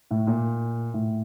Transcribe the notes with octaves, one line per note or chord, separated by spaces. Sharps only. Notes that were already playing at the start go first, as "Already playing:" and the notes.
A2
A#2
A2